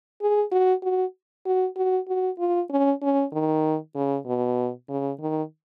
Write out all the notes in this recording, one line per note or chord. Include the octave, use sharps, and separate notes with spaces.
G#4
F#4
F#4
F#4
F#4
F#4
F4
C#4
C#4
D#3
C#3
B2
C#3
D#3